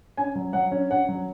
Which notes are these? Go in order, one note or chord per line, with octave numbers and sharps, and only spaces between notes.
C#4 G#5
F#3
F#3 F#5
C#4
C#4 F#5
F#3